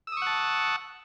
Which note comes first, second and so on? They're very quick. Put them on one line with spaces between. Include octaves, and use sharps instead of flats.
E6 D#6 C#6 F#5 A5